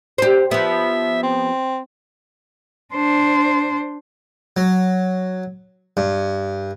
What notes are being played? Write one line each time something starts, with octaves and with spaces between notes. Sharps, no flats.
G4 C5
F3 B3 E5
C4
D4 C5
F#3
G2